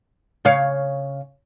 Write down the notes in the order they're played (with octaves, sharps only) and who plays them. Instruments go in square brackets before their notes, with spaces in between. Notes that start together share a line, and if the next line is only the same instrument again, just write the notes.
[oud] C#3 C#5 F5